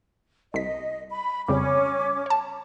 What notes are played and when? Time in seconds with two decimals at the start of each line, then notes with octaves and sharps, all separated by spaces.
0.54 C2 D#5 B6
1.11 B5
1.48 F2 C#3 G3 C#4 C#5 D6
2.26 C#5 A5